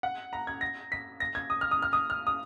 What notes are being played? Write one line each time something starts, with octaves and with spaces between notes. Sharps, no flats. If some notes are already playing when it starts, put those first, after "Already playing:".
F#5
A#5
G#6
A#6
B6
A#6
G#6
D#6
F6
D#6
F6
D#6
F6
D#6